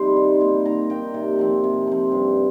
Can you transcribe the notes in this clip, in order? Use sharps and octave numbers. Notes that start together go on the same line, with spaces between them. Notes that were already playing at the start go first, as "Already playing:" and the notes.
Already playing: C3 G3 D#4 C6
D#3
A#3 D#4
D#3 A#5
A#3 D#4 G5
C3
F3 C4
C3
F3 C4
G2